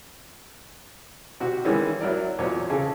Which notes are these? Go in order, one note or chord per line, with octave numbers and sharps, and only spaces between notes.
C3 F#4
D#3 E3 G3 G#3 C#4 D#4
F#3 E4 A#4 D5
E2 A#2 F#3 C4 C#5
C#3 G#4 A4